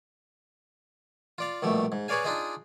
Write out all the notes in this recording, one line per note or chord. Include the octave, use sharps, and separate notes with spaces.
F4 D5 F5
A#1 B2 G3 A3
G#2
G#4 B4 C#5 D5 F5 G#5
D4 D#4 F4 G#4 D#5